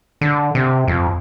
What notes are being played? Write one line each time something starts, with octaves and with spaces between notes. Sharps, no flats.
D3
C3
F2